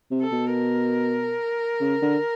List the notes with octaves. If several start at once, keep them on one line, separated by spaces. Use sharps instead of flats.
C3
A4
B2
A#4
C#3
D3